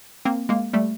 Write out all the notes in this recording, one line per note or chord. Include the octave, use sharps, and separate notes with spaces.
A#3 C4
G#3 A#3
G3 A3